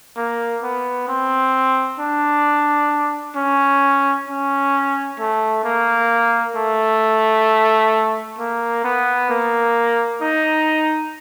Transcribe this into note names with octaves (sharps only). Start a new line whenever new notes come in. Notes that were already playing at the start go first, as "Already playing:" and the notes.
A#3
B3
C4
D4
C#4
C#4
A3
A#3
A3
A#3
B3
A#3
D#4